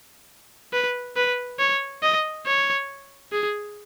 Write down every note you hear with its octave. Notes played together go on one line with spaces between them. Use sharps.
B4
B4
C#5
D#5
C#5
G#4